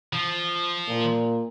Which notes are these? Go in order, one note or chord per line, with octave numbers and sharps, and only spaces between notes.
F3
A#2